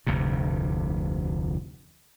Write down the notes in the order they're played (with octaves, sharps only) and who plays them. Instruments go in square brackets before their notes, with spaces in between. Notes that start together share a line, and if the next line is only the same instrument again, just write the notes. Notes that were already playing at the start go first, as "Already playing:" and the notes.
[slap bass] F1 D2 G2 C3